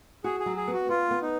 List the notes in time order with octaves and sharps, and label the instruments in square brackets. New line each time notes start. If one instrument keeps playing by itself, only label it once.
[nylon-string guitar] F#4 [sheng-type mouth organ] G#4
[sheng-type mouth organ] G#4
[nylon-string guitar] F#3
[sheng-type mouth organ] G#4
[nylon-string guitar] B3
[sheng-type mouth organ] F#4
[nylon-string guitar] B3 [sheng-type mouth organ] F4
[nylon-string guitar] B3
[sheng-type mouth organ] D#4